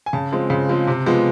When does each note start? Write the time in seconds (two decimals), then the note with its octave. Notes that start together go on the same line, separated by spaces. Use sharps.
0.06 G#5
0.13 C#3 A5
0.32 F3 G#3 C4
0.50 C#3
0.69 F3 G#3 C4
0.87 C3
1.06 F3 G#3 B3